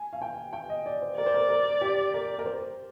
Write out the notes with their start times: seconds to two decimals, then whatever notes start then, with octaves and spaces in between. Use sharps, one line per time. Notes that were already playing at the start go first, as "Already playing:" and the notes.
Already playing: G#5
0.13 F5
0.22 G5
0.53 G5
0.69 D#5
0.86 D5
1.02 C5
1.17 A#4 D5
1.26 C5
1.34 A#4
1.49 A#4
1.81 G4
2.14 A#4
2.39 A#4
2.46 C5